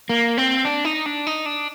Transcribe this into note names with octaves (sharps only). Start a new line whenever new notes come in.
A#3
C4
D4
D#4
D4
D#4
D4